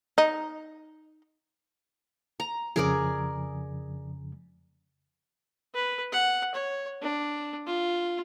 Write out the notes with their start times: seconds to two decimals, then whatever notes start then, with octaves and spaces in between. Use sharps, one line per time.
0.18 D#4
2.40 A#5
2.76 F2 C#3 F3 G#4 A#4 D5
5.74 B4
6.13 F#5
6.55 C#5
7.02 D4
7.67 F4